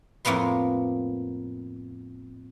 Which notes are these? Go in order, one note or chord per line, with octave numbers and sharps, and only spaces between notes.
F2 A2 A#3 B3 C6